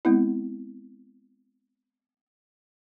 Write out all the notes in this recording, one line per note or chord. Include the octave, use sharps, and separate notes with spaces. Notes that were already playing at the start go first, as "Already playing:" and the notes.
G#3 B3 C4 E4